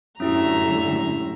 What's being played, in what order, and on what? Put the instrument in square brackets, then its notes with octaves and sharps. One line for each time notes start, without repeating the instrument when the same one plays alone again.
[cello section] F#2 A2 D3 [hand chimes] C#4 E4 G4 [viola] E5 A#5